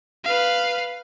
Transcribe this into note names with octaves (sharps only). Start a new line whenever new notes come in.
B4 F5